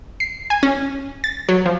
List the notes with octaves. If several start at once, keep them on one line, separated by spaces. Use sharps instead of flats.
C7
G#5
C#4
A6
F#3
F3